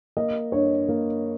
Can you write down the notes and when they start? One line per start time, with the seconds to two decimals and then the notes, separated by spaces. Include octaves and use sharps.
0.17 A#3 D#5
0.52 G2 C#5
0.89 A#3